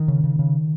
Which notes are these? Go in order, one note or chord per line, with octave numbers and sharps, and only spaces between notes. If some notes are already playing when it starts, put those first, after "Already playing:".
Already playing: D#3
C#3
C#3
C#3